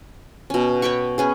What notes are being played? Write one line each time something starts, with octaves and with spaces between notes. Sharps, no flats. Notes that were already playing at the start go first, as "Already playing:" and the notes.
B2 C#4
C#5 G5 B5 C#6
B3 C#4 G#4